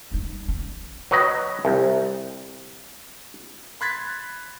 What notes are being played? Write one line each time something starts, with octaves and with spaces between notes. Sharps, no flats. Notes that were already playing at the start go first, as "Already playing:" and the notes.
G3 D#4
C#4
F#3 B4 D#5
C2
B5 C6 F#6 G#6 A6 B6